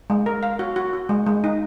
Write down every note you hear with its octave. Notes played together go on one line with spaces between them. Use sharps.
G#3
A#4
F5
F#4
F#4
F#4
G#3
G#3
D#4